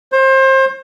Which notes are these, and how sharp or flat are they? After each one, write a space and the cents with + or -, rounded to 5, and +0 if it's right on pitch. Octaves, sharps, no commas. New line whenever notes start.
C5 +30